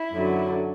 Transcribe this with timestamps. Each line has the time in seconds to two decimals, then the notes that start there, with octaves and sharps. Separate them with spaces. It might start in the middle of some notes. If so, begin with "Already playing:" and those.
Already playing: E4
0.11 F#2 D3 F#3